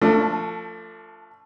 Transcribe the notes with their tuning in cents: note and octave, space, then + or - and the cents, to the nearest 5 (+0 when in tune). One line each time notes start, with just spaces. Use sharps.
F3 -5 A3 +25 D4 +0